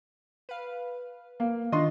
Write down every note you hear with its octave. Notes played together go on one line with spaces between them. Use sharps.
B4 F5
A#3
D#3 D4 F4 D#5 C6